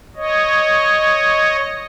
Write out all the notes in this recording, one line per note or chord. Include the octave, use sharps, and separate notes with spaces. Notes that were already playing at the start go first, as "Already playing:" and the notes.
C#5 D#5